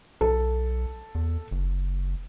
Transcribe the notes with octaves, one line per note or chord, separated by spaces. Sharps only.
B1 A4
E2
F#1